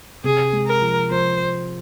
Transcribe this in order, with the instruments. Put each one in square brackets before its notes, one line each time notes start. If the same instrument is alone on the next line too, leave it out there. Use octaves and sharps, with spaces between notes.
[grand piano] C3 [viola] G#4
[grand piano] G#3
[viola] A#4
[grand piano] F3
[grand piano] F3 [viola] C5